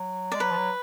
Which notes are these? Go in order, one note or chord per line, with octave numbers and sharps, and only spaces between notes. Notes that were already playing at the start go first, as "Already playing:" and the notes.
Already playing: F#3
G#3 D5
F#3 B4
F3
F#3